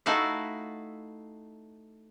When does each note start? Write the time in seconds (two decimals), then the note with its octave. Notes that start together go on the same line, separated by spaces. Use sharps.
0.06 A3 D#4 E4 F#4 F5